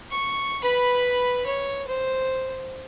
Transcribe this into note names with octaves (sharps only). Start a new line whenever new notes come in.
C#6
B4 B5
C#5
C5